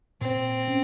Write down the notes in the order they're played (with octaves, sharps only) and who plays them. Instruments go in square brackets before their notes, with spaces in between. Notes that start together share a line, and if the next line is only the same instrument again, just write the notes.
[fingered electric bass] A#2 [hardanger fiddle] C4
[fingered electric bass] C#4